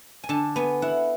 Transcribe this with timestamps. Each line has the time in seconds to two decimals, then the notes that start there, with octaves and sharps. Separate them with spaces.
0.24 G#5
0.29 D3 A5
0.56 B3 G#5
0.82 E4 F#5